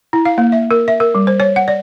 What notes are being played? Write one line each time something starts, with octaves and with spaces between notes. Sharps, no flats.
E4
F5
A#3
E5
A#4
E5
A#4
G3
C5
C#5
F#5
D5